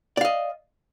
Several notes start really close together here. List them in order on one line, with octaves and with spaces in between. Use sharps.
D5 F5 D#5